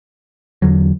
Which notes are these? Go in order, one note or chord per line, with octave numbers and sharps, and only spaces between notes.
E2 D3 F#3